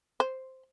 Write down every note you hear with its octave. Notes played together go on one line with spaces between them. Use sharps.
C5